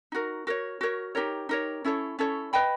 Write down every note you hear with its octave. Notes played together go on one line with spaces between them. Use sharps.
D#4 F#4 A#4
F#4 A#4 C#5
F#4 A#4 C#5
D#4 G4 A#4 C#5
D#4 G4 A#4 C#5
C#4 E4 A4 C#5
C#4 E4 A4 C#5
B4 D#5 G5 B5